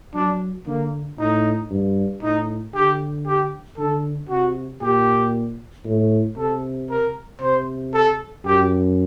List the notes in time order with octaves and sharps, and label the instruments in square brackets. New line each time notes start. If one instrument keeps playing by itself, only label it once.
[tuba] F#3 [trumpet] D4
[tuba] D3 [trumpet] A#3
[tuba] A2 [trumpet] D#4
[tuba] G2
[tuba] A2 [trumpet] D#4
[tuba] D3 [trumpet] G4
[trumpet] G4
[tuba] D3 [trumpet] A4
[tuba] C3 [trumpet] F#4
[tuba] A#2 [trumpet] G4
[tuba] A2
[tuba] C3 [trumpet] A4
[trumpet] A#4
[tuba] C3 [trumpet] C5
[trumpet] A4
[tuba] F#2 [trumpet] G4